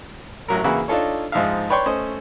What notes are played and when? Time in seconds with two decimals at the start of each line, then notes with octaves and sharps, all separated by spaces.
0.48 A1 F#3 A#4
0.64 C#3 E3 A#3 E4 F#4
0.88 D4 D#4 F4 A4 C#5
1.32 G#2 F3 D#4 E5 F5
1.70 B4 C#5 D5 G5 C6 C#6
1.86 A3 C#4 C5 D#5